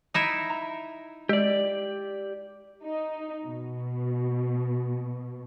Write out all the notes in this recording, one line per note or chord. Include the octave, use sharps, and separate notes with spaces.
D#4 E4 E5
A#5
G#3 G4 D5
D#4
B2